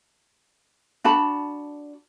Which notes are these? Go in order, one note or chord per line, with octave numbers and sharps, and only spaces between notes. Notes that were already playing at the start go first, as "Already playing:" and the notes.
D4 F#4 A5 B5